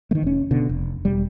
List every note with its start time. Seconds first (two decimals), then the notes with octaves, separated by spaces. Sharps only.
0.11 D#3 E3 A3
0.23 F1 C#4
0.51 B2 D3
0.69 F1
1.05 E1 G3